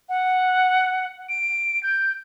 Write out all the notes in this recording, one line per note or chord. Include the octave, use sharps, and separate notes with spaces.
F#5
D7
G6